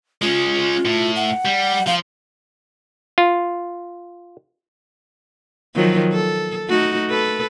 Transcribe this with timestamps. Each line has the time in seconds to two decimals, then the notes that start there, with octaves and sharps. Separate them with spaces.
0.22 G#3 C#4 F4
0.85 A2
1.16 F#5
1.45 G3
1.87 F3 F5
3.18 F4
5.75 D#3 F3 F#3
6.12 A4
6.68 A3 D#4 F#4
7.10 A4 B4